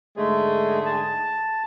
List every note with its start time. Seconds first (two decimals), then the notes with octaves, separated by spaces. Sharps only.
0.17 G#2 D3 G#3 A3 G#4
0.86 A5